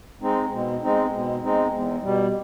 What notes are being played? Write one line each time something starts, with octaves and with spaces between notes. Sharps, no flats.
G#3 C4 D#4
B2
G#3 C4 D#4
B2
G#3 C4 D#4
E2
B2 G3